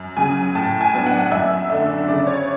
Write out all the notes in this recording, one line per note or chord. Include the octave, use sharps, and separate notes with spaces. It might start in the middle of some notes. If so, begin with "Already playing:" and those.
Already playing: F#2
C#3 F#3 G#5
A2 A5
G#5
F#3 B3 D4
F#5
F#2 E5
D3 A3 D4 E5
C#3 D5
C#5